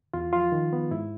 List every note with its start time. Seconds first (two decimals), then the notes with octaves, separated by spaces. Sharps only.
0.14 E2 F4
0.33 F3 F4
0.52 D#3
0.73 B3
0.91 G#2 E4